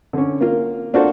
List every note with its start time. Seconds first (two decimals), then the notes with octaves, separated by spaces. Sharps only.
0.13 D3 C#4
0.41 A#3 F4
0.93 A#3 D4 F4 F#4 A4 C5